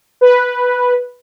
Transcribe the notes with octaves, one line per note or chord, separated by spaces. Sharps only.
B4